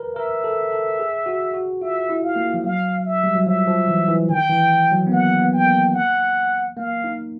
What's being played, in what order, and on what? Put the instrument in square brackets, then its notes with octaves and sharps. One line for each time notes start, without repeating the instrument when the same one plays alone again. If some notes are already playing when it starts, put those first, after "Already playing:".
Already playing: [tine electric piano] A#4 B4
[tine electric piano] A#4 [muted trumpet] E5
[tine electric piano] A4
A4
G#4
F#4
F#4
[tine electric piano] F4 [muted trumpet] E5
[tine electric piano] E4
[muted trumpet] F5
[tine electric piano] A#3
F3
[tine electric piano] F#3 [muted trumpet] F5
[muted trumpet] E5
[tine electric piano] G3
F#3
[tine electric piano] F3 [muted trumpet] E5
[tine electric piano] F3
E3
E3
[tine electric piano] D#3 [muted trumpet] G5
[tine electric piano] E3
F#3
B3
[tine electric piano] A#3 [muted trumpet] F#5
[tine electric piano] B3
[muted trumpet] G5
[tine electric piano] A#3
[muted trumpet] F#5
[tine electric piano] A#3 [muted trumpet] F5
[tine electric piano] D#4